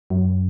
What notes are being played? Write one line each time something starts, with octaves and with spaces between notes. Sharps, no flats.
F#2